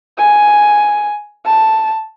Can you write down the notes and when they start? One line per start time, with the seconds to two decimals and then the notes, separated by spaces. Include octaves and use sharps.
0.18 G#5
1.46 A5